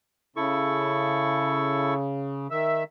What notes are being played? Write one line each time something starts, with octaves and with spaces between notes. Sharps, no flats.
C#3 E4 A4 C#6
D#3 E5